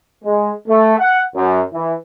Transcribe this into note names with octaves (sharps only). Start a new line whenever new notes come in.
G#3
A3
F#5
F#2
E3